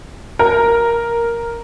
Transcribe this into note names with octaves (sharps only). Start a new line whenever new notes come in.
A#4